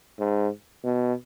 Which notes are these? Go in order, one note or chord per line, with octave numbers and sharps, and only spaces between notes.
G#2
B2